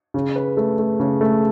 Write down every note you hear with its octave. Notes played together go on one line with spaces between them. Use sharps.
C#3
B4
A3
A3
C#3
A3